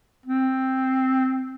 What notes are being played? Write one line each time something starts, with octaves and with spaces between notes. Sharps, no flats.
C4